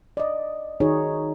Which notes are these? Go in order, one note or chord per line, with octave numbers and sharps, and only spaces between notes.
D5 D#5
D#3 D#4 F#4 G#4 C#5 D#5